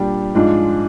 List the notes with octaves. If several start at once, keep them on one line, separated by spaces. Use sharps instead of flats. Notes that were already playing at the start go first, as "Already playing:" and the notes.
Already playing: A#2 G3 D4 G4
G#2 F3 G#3 D4 F4